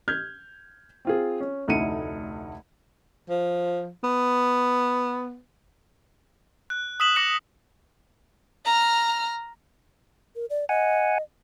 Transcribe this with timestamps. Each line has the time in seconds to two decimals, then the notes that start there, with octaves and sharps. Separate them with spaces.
0.08 F6 G6 G#6
1.05 C4 F4 G#4
1.40 C#4
1.68 F1 D2 D#4 E4 C#7 D#7
3.29 F3
4.04 B3
6.70 F#6
7.00 D#6 E6 B6 E7 F#7
7.16 D6 F#6 A#6 C#7 E7 F#7
8.66 A#5 F6
10.36 A#4
10.50 D5
10.69 D#5 F#5 G#5